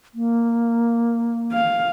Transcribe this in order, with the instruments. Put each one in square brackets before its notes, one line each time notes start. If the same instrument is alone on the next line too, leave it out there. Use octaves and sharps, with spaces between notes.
[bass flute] A#3
[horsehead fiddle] F5